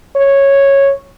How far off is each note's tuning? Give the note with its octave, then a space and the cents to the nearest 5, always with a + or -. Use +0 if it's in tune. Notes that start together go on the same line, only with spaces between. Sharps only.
C#5 -10